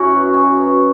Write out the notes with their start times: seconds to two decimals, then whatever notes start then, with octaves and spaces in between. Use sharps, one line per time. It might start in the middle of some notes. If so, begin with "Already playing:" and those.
Already playing: F#2 C#4 E4 F#4
0.11 F#3 B3
0.34 B2 G#4
0.57 F#3 B3